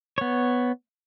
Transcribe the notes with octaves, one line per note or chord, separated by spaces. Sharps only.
B3 C#5